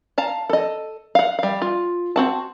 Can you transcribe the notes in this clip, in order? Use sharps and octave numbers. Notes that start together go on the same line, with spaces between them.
F5 A5 A#5
A4 D#5
F5 F#5
G3 F5
F4
C4 F#4 A5